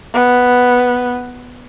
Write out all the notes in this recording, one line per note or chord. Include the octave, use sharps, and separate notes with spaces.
B3